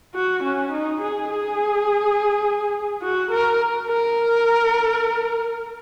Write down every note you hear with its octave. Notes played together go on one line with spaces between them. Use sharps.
F#4
C#4
D#4
G#4
G#4
F#4
A#4
A#4